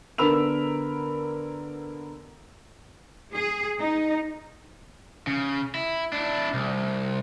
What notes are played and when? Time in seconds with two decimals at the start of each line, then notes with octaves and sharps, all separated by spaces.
0.18 D3 B3 A#4 B5 E6 F7
3.34 G#4
3.79 D#4
5.27 C#3
5.75 E4
6.13 D4 E4
6.54 C2